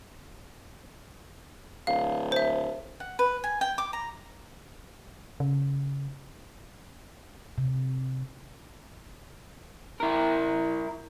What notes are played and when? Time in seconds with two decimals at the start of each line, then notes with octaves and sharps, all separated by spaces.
1.87 D1 F5
2.32 C5 E5
3.00 F#5
3.19 B4
3.44 G#5
3.61 G5
3.78 D6
3.93 A#5
5.40 C#3
7.58 C3
10.00 E4 A#4